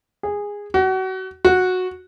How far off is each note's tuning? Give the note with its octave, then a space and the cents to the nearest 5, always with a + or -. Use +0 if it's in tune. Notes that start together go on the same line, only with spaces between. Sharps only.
G#4 -15
F#4 +30
F#4 -10